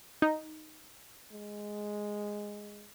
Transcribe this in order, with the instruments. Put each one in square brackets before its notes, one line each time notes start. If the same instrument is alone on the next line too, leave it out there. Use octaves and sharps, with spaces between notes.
[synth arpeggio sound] D#4
[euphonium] G#3